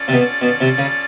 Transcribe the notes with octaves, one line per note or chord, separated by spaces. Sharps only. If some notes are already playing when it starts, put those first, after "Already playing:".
Already playing: C#4 F4 A4 D5
C3
B2
B2
C3
C#3